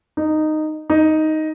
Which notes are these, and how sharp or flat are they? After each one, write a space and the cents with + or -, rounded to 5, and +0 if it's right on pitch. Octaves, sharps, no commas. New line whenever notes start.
D#4 -10
D#4 +5